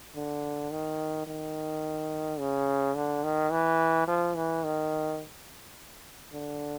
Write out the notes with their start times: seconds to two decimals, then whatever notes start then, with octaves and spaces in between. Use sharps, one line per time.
0.15 D3
0.71 D#3
1.27 D#3
2.39 C#3
2.96 D3
3.24 D#3
3.52 E3
4.08 F3
4.36 E3
4.65 D#3
6.33 D3